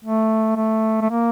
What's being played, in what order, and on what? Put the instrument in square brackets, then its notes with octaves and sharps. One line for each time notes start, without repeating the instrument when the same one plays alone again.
[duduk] A3
A3
A3
A#3